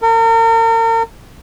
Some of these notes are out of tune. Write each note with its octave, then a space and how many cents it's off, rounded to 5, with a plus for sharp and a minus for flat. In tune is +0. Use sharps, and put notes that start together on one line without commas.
A#4 -40